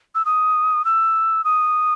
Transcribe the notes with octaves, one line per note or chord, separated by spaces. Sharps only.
E6
D#6
E6
D#6